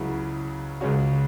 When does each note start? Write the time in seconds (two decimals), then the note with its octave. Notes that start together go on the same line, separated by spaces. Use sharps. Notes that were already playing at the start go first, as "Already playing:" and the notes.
Already playing: C#2 C#3 F#3 C#4 E4
0.81 C#2 C#3 G#3 C#4 F#4